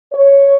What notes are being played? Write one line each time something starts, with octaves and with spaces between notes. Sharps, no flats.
C#5